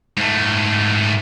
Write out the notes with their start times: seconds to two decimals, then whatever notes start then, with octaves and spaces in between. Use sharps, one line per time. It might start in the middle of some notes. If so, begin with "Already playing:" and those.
0.17 G#2 A3